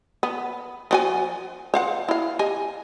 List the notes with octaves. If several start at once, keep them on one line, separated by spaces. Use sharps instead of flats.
B3
F3 F#4 G#5
C5 F5 F#5
E4 F5
G4 D#5 G#5